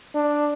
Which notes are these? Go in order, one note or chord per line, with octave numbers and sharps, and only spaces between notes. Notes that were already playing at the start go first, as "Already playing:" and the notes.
D4